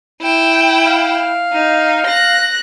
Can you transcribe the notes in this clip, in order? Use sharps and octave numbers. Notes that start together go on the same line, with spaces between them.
E4 G5
F5
D#4
F#6 A#6